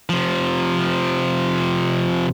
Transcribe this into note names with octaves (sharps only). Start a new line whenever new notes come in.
C3 F3